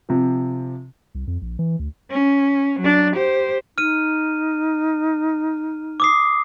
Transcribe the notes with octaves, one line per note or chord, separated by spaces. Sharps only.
C3 F3
C2
F2
A#1
E3
D2
C#4
F#3 D4
G4 C5
D#4 F6 D#7
D6 D#6 C7